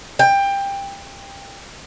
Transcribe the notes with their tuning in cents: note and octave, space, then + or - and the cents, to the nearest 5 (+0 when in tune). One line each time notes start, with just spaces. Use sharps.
G5 +20